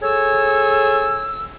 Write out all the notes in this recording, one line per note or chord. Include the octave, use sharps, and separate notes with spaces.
G#4 A4 C#5 E6